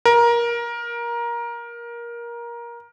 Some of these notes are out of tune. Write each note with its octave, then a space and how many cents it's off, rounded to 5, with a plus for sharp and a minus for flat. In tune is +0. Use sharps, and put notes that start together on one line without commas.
A#4 +20